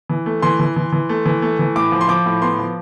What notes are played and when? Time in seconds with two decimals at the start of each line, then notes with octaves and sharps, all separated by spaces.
0.10 E3
0.26 A3
0.42 E3 C6
0.60 E3
0.76 E3
0.93 E3
1.09 A3
1.26 E3
1.42 A3
1.59 E3
1.76 A2 D6
1.92 F3
2.01 C6
2.09 F3 D6
2.26 A2
2.41 B3 C6
2.59 F3